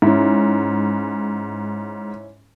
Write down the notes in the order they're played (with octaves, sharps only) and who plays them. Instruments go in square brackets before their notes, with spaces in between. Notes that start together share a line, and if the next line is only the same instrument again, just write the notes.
[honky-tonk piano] G#2 [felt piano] C#4 E4